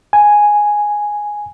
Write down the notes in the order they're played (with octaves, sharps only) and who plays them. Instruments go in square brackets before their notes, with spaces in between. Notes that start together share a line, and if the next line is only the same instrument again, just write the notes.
[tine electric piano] G#5